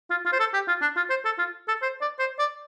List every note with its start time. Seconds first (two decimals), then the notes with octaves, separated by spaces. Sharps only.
0.10 F4
0.25 F4
0.33 C5
0.40 A4
0.54 G4
0.68 F4
0.82 D4
0.97 F4
1.10 C5
1.25 A4
1.39 F4
1.68 A4
1.82 C5
2.01 D5
2.19 C5
2.39 D5